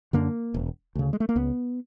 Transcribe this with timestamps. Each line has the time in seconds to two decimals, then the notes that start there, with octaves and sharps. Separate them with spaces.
0.13 F#2 D3 A#3
0.54 E1
0.95 D2 C#3
1.13 G#3
1.20 A3
1.29 A#3
1.36 C#2 B3